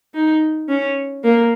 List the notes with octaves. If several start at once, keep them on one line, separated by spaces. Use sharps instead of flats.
D#4
C#4
A#3